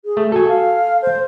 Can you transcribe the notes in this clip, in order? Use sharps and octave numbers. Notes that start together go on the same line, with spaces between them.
G#4
A3
F#4 A4 G#5
F5
C5